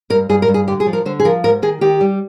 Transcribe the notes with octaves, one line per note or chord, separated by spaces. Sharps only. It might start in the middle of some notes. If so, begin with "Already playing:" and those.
G2 A#4
G2 G#4
A#4
G2
G#4
D3 G4
G#4
F3
A#4
D3 C5
G#4
F3 A#4
G#2 A#4
D#3 G#4
D#3 G4
G3